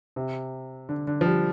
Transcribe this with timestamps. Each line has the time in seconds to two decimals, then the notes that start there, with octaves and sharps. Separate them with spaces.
0.16 C3
0.89 D3
1.07 D3
1.21 F3
1.26 G3